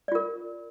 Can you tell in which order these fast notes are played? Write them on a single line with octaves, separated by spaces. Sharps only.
D5 F4 A#4